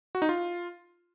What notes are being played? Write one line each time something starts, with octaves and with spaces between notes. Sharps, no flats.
F#4
D#4
F4